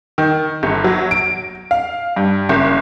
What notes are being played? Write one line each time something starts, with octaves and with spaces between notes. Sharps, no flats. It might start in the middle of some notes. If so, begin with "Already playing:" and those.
D#3
G1
F#3
D7
F5
G2
F#1